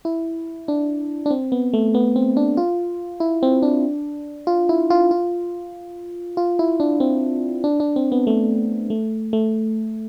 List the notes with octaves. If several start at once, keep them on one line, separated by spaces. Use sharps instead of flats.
E4
D4
D4
C4
B3
A3
B3
C4
D4
F4
E4
C4
D4
F4
E4
F4
F4
F4
E4
D4
C4
D4
D4
C4
B3
A3
A3
A3